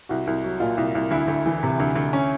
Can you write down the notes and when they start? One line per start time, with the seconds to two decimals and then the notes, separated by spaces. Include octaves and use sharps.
0.09 C2 F#4
0.27 C2
0.44 F#3
0.60 A#2 F4
0.77 C2
0.95 C2
1.11 D2 E4
1.28 D2
1.46 E3
1.63 C3
1.80 D2
1.96 D2
2.13 C#4